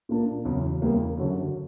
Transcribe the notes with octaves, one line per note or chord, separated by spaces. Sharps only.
A#2 A#3 D4
E2 C#3 F#3
E2 C#3 G3 A#3
F#2 D3 F#3 C#4